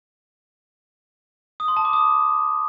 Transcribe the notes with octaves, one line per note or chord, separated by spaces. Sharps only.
D#6
C6
A5
D6
D#6